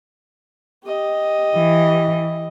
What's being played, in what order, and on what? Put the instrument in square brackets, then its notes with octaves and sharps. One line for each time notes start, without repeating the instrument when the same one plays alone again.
[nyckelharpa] G4 D#5
[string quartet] E3